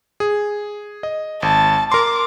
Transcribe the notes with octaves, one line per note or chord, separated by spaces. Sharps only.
G#4
D#5
G#1 A5
A#4 A#5 C6 D6